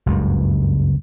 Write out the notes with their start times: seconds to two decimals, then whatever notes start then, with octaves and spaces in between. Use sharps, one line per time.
0.06 F#1 C#2 G2